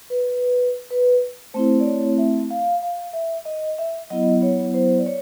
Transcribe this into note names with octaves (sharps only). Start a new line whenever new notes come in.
B4
B4
A3 C4 E4 C5
D5
C#5
E5
F5
F5
E5
D#5
E5
F#3 B3 E4 D#5
C#5
C5
D5
C#5